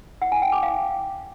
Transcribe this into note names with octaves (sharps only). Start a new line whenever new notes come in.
F#5
G#5
G5
D6
F5